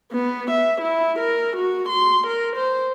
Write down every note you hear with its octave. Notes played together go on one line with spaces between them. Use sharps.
B3
E5
E4
A#4
F#4
C6
A#4
C5